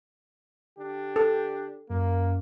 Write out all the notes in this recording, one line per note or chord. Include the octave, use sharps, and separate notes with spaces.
D3 D4 G4
A4
F#2 A#3